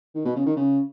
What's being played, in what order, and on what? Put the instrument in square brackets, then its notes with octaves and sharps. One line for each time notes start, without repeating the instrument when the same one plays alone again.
[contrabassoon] D#3
B2
C#3
D#3
C#3